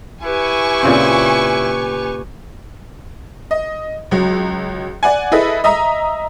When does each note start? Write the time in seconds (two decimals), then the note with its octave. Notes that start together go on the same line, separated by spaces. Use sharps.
0.23 E4 G4 B4 G#5 C#6
0.83 A#2 C#3 C4
3.51 D#5
4.11 C#2 F#3
5.03 D5 F#5 G#5
5.32 E4 G#4 A4 B4 D#5 E5
5.64 D#5 E5 A#5 D#6